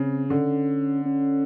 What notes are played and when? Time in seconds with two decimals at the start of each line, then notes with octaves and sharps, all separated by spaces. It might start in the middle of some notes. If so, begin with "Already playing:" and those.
Already playing: C#3 C4
0.29 D3 C#4
1.05 C#4